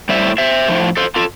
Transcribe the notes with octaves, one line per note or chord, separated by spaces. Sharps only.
A2 G3 C5 E5
C5 E5
A2 F3 A3
A4 C5
F4 A4